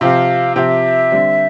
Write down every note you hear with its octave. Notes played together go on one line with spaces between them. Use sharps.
C3 F3 C4 G4 F5
C3 F3 C4 G4 E5 G5
D3 G3 C4